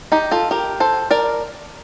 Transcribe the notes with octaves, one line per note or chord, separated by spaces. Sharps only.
D#4 G4
F4 A4
G4 A#4
A4 C5
A#4 D5